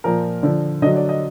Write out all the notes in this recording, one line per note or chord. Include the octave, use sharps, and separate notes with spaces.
A#2 F3 A#4
D3 F3
D3 F#3 D#5
D5
D#5